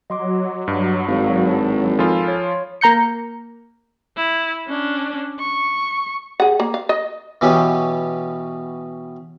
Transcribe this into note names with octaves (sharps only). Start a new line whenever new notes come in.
F#3 D#5 C6 D6
G2
G#1 F#4 F5
A5
F3 F4 A4 G#5 B5
C#5
A#3 A#5 G6 C#7
E4
C#4 D4
C#6
G#4 F#5
A#3
F5
D#5
B2 E3 B3 C#4 G4